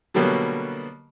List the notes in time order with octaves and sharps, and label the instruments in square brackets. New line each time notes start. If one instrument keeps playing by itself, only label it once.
[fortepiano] B2 D3 F#3 G3 A#3 B3